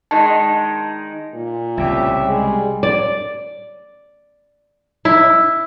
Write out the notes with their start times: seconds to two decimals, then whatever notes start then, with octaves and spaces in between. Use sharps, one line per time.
0.11 D#3 G#3 D#4 A5
1.34 A#2
1.77 C2 A2 C#3 G4 E5
2.26 G3 G#3
2.83 D5
5.05 E4